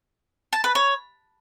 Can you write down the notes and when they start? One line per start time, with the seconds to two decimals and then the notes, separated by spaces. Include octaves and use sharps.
0.53 A5
0.64 B4
0.75 C#5